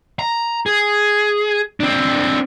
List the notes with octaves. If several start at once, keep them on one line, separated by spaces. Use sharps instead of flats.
A#5
G#4
C4 D4